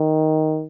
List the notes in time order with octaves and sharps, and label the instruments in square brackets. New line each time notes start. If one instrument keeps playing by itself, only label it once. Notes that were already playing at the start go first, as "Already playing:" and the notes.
Already playing: [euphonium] D#3